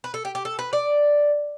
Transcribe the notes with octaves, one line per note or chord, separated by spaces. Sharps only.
B4
A4
G4
G4
A4
B4
D5